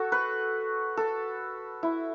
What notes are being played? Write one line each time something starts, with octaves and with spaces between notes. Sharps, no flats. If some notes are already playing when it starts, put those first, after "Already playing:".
Already playing: F#4 A4
B4
A4
E4